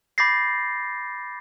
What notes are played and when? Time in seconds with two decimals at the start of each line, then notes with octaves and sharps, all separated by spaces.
0.18 B5 D6 G6 A6 A#6 C7